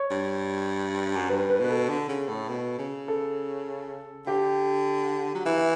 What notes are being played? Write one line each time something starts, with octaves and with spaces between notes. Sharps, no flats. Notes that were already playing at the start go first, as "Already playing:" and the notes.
Already playing: C#5
G2
F#2
G2 B4
B4
B2 B4
A4
D3
C#3
A2
B2
C#3
A4
D3 G4
F#3
E3 E4
E4